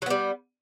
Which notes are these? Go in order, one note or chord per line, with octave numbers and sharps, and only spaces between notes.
F#3 G3 B3